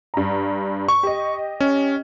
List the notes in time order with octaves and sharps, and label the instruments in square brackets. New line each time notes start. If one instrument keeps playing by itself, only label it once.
[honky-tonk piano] G2 A#5
[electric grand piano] C#6
[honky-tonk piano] G4 D#5
[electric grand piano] C#4